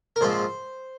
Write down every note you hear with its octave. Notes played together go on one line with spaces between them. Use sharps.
A#4
A#1 G#2 F3 C4 C5